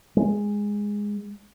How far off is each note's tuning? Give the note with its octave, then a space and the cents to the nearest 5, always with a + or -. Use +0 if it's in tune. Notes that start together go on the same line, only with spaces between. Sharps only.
G#3 -10